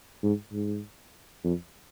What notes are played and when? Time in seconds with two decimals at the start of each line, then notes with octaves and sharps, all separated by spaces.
0.23 G#2
0.52 G#2
1.44 F2